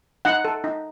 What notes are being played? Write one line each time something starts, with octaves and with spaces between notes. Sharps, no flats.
D#4 F#5
A4
D#4